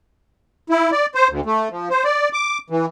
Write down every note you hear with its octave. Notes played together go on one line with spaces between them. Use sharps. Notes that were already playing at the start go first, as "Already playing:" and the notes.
E4
D5
C5
D2
A3
F3
C5
D5
D6
E3